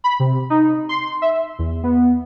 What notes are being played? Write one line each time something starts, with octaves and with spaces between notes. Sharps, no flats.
B5
C3
D#4
C6
E5
E2
B3